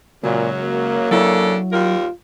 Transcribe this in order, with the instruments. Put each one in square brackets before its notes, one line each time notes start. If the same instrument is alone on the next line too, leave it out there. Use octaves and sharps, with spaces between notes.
[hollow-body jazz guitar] C#2 [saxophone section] F#2 C#3 F#3 [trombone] A#2
[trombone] A#3
[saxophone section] C#3 D4 A4 [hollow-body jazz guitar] F#3 E4 C#5
[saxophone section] D#2 G3 A#4 [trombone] F4